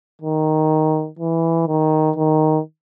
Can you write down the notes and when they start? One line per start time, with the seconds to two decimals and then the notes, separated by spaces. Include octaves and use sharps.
0.21 D#3
1.19 E3
1.67 D#3
2.16 D#3